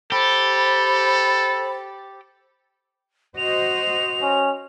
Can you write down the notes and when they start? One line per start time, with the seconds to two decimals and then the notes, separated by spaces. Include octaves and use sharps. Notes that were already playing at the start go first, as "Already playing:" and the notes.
0.12 G4 A4 C5 B5
3.37 F#4 C5 D#5 F7
4.22 C#4